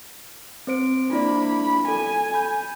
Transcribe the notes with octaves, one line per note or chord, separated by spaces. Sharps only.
C4 C5 D7
A#3 D4 E4 D5 B5
A4 G#5
B5 G6